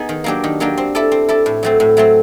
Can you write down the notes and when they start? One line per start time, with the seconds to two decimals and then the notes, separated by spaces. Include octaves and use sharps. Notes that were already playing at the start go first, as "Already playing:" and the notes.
Already playing: B3 D#4 G#4
0.09 D#3
0.24 F#3 A#3 D4 G4
0.44 D#3
0.60 F#3 A#3 D4 G4
0.78 C4
0.95 E4 A4 D5
1.12 C4
1.29 E4 A4 D5
1.46 A2
1.63 F#3 A3 C4
1.80 A2
1.97 F#3 A3 C4